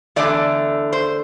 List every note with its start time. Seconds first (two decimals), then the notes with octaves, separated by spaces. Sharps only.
0.16 E2 D3 A3 D5
0.93 C5